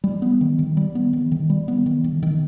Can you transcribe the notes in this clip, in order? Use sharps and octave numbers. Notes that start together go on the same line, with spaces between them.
G3
B3
D#3
D#3
G3
B3
D#3
D#3
G3
B3
D#3
D#3
D#3